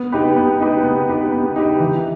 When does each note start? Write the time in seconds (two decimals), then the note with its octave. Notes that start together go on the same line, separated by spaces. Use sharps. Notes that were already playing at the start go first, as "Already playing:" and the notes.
Already playing: B3
0.12 D#4 G4 B4
0.36 B3
0.60 D#4 G4 B4
0.83 B3
1.09 D#4 G4 B4
1.32 B3
1.56 D#4 G4 B4
1.80 E3